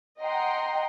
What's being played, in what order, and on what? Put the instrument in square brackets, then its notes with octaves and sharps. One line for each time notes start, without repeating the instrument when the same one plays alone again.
[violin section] D#5 F#5 G5 A#5 C6